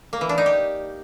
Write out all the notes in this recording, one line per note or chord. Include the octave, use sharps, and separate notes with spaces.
A#3
E3
D4
D#4
G4